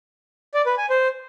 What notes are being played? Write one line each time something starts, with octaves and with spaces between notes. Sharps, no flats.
D5
B4
G#5
C5